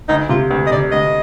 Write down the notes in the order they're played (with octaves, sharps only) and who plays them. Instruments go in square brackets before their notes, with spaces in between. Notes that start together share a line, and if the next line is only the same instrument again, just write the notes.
[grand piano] D2 [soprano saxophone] D#4
[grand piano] C3 [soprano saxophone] F4
[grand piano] D2
[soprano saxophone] D#5
[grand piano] C3 [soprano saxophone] D5
[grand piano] D2 [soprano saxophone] D#5